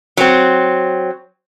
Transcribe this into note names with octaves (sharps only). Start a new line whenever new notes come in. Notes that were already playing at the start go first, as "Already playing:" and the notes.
F#3 C4